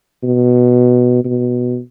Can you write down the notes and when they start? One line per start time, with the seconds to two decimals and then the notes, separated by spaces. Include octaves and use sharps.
0.23 B2
1.25 B2